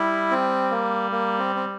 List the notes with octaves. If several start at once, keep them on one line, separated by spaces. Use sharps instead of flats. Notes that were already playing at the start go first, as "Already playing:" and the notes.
Already playing: G3 E4
C4
A#3
A#3
C4
C4